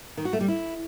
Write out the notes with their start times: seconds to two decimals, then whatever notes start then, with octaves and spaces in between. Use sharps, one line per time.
0.17 D#3
0.25 F#4
0.33 A3
0.41 G3
0.48 E4